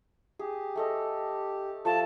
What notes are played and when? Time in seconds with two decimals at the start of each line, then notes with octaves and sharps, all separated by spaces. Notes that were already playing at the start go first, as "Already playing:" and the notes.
0.39 G4 G#4
0.76 A3 A4 D#5
1.85 F3 A3 A4 A5